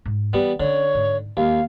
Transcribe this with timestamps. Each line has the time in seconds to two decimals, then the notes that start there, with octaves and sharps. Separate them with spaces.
0.06 G#2
0.33 E3 G3 B3
0.60 D3 C#4 C#5
0.95 G#2
1.37 D#2 G#3 F5